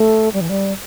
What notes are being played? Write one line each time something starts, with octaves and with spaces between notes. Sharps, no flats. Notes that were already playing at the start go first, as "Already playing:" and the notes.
Already playing: A3
G3
E3
G3